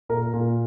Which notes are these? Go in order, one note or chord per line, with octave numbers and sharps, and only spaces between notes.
A#2 A#4
A#2